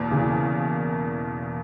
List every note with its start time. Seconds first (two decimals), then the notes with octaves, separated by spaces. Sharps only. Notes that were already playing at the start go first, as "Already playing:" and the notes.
Already playing: E2 B2 A#3
0.12 C#3 E3